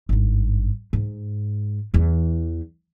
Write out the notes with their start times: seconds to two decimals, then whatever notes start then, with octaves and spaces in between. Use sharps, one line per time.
0.09 G#1 G2
0.93 G#2
1.94 E2 E3